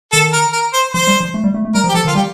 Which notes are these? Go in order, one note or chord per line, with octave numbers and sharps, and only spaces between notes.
D#3 A4
A#4
A#4
C5
F3 C5
G3
F3
A3
G3
A3
A3
G3 A#4
F3
G4
F3 A4
D#3
F4
G3 G4